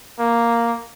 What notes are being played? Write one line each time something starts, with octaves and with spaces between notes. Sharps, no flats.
A#3